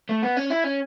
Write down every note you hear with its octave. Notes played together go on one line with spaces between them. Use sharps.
A3
B3
C#4
E4
C#4